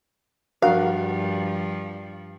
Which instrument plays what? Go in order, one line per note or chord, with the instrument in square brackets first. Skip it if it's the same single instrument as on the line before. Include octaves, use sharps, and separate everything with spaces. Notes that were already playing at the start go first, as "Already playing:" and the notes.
[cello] G2 F3 [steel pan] D4 F#4 A#4 [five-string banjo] F5